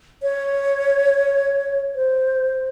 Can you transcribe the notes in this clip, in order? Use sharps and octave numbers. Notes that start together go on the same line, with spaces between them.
C#5
C5